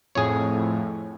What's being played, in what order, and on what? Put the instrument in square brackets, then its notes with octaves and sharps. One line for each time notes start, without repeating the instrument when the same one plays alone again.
[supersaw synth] F2 A2 [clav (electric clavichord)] G#4 C#5